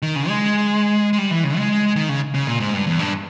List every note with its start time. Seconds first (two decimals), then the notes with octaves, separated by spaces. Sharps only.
0.02 D#3
0.16 C#3
0.29 G#3
1.13 G#3
1.18 G3
1.31 E3
1.44 C#3
1.57 G#3
1.96 D#3
2.09 C#3
2.34 C#3
2.47 A#2
2.60 G#2
2.74 G2
2.87 E2
2.99 G2